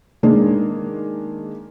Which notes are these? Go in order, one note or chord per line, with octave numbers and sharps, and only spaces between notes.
D#3 G#3 A#3 D4